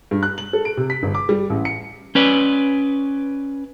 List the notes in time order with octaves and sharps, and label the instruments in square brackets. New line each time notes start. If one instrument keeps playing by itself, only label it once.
[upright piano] G2
F#6
F#7
A4
D7
C3
B6
G1
D6
G3
A1
C#7
[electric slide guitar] C#4 B4 D5